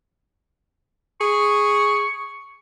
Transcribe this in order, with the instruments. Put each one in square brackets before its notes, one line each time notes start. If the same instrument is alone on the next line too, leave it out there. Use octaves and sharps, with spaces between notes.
[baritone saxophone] G#4 [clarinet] C#6